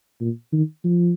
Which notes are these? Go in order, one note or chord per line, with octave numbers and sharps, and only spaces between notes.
A#2
D#3
F3